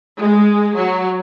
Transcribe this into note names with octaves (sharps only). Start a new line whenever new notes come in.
G#3
F#3